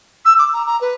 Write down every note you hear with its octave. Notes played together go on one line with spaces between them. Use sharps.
E6
D6
A#5
A#5
B4